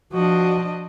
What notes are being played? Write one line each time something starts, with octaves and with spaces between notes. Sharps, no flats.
F3 D4 F#4 D#5